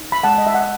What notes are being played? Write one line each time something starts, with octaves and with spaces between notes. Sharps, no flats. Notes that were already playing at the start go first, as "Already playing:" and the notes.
Already playing: D#4
B5
G#3 F#5 A5
D#5
E5
F#5